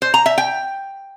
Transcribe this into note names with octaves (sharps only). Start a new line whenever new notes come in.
C5
A#5
E5
G5